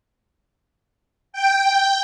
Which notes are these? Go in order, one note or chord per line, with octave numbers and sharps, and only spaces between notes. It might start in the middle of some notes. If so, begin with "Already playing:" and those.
G5